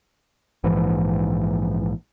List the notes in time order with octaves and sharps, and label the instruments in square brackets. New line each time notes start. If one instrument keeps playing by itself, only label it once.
[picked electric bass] A#1 G#2 E3 F3